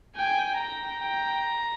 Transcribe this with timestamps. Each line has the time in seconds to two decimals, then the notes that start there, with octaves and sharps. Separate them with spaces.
0.16 G5 G#5
0.58 G5 A#5
1.00 G5